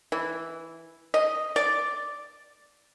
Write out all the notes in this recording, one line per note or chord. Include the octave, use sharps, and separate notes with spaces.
E3
D#5
D5